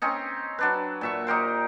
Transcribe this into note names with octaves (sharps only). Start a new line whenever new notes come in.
C4 C#4 D#4
F#3 D4 B4
A#2 E5 C#6
D#4 G4 A#4 C5